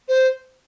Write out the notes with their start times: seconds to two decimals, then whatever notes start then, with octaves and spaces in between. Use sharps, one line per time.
0.08 C5